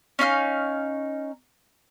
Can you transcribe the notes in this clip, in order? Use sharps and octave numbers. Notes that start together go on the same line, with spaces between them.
C#4 D#4 F5 F6